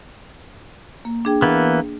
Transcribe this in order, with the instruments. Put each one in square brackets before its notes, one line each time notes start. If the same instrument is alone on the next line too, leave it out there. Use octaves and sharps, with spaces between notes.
[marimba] A#3
D4 G#4 G5
[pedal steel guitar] E3 A#3 B3